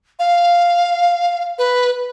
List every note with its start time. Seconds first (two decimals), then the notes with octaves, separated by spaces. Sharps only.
0.19 F5
1.58 B4